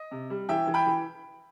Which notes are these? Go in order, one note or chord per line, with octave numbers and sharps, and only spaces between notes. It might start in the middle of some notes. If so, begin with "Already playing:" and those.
Already playing: D#5
C3
G3
E3 E5 G5
E3
G5 B5
E3